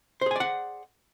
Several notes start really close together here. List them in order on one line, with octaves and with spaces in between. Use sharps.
C5 G#4 G#5 D5 F#5